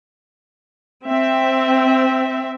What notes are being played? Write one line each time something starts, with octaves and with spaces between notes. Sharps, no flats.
C4 E5